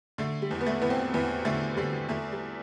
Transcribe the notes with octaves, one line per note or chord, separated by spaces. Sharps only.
D3 A3
G3
E2
B3
A3
E2 B3
C4
E2 B3
D3 A3
D3 G3
E2 A3
G3